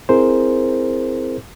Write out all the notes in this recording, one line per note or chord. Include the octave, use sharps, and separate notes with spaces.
C4 E4 G#4 A#4 C5